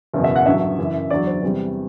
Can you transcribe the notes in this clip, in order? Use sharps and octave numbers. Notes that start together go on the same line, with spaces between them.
F#1 E2 B2
E5
F#5
A1 G2 D3 F#3 E5
F#1 F#2 E3
E2 D3 F#3 D5
C5
E2 C3 G3